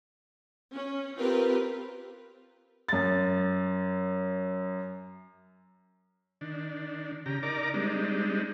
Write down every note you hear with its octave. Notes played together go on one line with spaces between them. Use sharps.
C#4
C4 F4 G4 A#4 B4
F#2 A6
D#3 D4
C#3 G4 A#5
D#4 A#4 D5 A#5 D6
G3 G#3 C4 D4 D#4